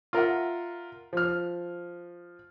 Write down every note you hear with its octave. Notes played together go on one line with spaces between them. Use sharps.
F4 A#4 E5 F#5
F3 F6